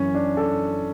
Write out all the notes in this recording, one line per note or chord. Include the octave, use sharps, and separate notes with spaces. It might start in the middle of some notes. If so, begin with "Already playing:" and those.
Already playing: F#2 E3 C#4
D4
A4